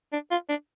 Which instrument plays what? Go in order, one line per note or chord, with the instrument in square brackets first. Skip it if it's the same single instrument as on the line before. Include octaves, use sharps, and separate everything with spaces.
[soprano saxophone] D4
F4
D4